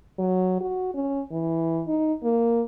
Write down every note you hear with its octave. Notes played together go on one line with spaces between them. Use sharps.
F#3
F#4
C#4
E3
D#4
A#3